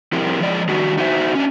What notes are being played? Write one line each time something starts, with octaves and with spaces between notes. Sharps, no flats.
F3 C4 E4 G4 A#4
F3 G#3 D5
D#3 G3 D4 F#4
D#4 F#4 C5 E5
C#4 D4